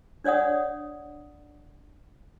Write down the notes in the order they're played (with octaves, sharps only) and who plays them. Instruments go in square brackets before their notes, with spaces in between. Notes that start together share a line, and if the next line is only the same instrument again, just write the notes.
[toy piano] D4 C#5 D5 F#5 D#6